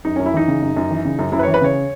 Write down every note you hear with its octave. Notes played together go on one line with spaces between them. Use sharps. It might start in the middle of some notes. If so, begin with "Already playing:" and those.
F#2 D#4
F#2 C#4
E4
E3 D#4
C#3
F#2
F#2
E3
C#3
F#2
F#2 E4
B4
E3 C#5
B4
C#3 C#5